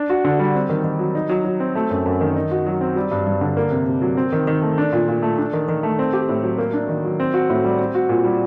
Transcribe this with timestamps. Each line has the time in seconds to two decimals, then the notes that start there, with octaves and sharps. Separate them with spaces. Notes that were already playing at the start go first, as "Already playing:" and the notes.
Already playing: D4
0.10 F#4
0.25 D3
0.39 G3
0.55 C4
0.70 D#3
0.84 D#3
0.99 F#3
1.15 D#4
1.29 F#3
1.45 F#3
1.60 C4
1.75 A3
1.90 F#2
2.06 F#2
2.21 D#3
2.36 D#4
2.51 F#4
2.66 F#3
2.81 C4
2.96 G3
3.11 G2
3.27 G2
3.41 D3
3.57 A#3
3.71 C3
3.87 C3
4.02 F#3
4.17 C4
4.32 D#3
4.47 D#3
4.62 A3
4.78 D4
4.93 A#2
5.08 A#2
5.22 A3
5.38 D4
5.53 D#3
5.69 D#3
5.83 A3
5.99 C4
6.13 G4
6.29 A2
6.43 F#3
6.58 A#3
6.73 D4
6.89 D#3
7.04 F#3
7.20 C4
7.34 F#4
7.50 A2
7.64 G3
7.79 C4
7.95 F#4
8.09 A#2
8.24 G3